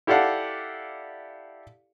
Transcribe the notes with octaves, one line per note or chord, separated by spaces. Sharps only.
E4 G4 A4 D5 F5 F#5